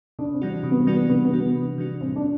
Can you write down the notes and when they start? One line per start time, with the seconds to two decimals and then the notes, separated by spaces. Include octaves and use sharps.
0.19 C3 D4
0.34 C4
0.42 E3 G3 D4 F#4
0.49 C4
0.63 C3
0.72 B3
0.79 C4
0.87 E3 G3 D4 F#4
0.94 B3
1.09 C3 B3
1.25 B3
1.33 E3 G3 D4 F#4
1.40 B3
1.56 C3
1.78 E3 G3 D4 F#4
2.01 A2 C4
2.16 D4